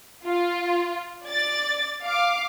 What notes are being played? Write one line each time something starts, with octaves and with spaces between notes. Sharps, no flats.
F4
D5 A6
F5 D6